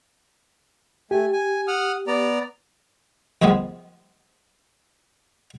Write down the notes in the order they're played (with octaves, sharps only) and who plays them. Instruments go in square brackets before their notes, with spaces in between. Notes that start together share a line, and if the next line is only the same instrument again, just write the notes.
[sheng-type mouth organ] A3 G#5 [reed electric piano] G4
[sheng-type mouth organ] G#5
F#5 D#6 F6
B3 D5 A#5
[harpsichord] F2 D#3 F3 G#3 B3